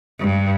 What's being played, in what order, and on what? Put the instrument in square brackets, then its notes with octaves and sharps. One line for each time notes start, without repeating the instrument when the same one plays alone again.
[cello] G2